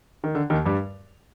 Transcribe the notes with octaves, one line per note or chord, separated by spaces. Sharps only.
D#3
D3
D#2 D#3
G2 G3